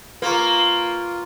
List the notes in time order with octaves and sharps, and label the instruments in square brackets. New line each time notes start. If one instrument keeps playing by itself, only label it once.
[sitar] A#3 [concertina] F4 [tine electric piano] B4 A#5 C#6